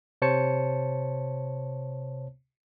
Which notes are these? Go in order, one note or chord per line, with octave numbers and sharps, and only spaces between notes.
C3 C5 C#5 A5 C#7